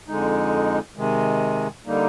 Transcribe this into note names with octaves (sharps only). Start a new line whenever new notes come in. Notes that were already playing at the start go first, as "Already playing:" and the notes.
F2 D3 G#3 D#4
C3 D#3 G#3
D3 G3 A#3 D#4